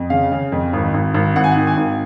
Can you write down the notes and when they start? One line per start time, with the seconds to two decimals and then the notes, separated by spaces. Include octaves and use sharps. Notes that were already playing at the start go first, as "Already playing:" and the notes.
Already playing: F2
0.10 C#3 F5
0.32 C#3
0.52 F2
0.73 G#1
0.94 G#1
1.14 G#1
1.36 G#1 F#5
1.44 G#5
1.51 F#5
1.56 D#3
1.67 G#5
1.77 G#1